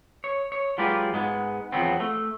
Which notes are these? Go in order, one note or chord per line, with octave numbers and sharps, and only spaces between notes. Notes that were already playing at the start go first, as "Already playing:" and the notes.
C#5
C#5
F#3 G#3 F4 G4 B4 D5
G#2 G#3 B3
E2 F3 F#3 B3 C4
A3